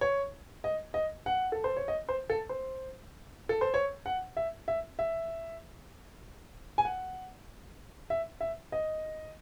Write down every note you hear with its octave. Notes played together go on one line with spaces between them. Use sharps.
C#5
D#5
D#5
F#5
A4
C5
C#5
D#5
C5
A4
C5
A4
C5
C#5
F#5
E5
E5
E5
G#5
F#5
E5
E5
D#5